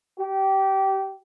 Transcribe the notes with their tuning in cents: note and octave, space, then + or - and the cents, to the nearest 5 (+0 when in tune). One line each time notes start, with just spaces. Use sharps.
G4 -20